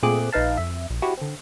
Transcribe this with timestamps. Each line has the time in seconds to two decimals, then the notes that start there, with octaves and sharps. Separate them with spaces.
0.03 A#2 A3 C4 G#4 D6 F#6
0.33 A#1 D#4 B4 F5 A5
0.57 F2 E5
0.90 A#1
1.02 E4 F#4 G4 C#5
1.17 D3 C4